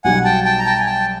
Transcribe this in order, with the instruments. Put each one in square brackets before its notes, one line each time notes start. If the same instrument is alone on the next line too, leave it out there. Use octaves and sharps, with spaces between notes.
[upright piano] B1 B2 G3 [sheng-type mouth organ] F#5 G#5
[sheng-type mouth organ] G5 A5
G5 A5
A#5
G5 A5
G#5
G5 A5